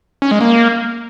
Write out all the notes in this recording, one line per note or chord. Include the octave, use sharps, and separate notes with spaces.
C#4
G#3
A#3